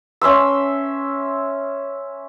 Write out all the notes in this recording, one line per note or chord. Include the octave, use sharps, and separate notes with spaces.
C#4 E5 C6 E6